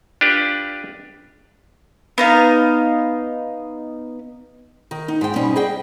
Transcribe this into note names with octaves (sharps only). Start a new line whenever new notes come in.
D4 F4 G4 B4
B3 D#4 F5
D#3
D#4
G#2 G5
B2 G3 C4 C#4 D#4
G#4 D#5 G5